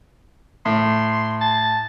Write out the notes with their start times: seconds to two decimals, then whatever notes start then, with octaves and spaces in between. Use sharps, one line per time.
0.65 A2 C6
1.41 A5